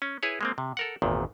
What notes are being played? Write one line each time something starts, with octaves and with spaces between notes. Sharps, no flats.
C#4
E4 G#4 B4 C#5
G#3 A#3 C4
C3
A4 A#4 F#5
G#1 E2 A#2 D#3